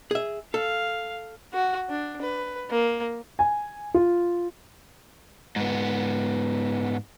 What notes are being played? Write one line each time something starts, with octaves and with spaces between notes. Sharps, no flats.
G#4 E5
A4 F5
F#4
D4
B4
A#3
G#5
F4
G#2 B3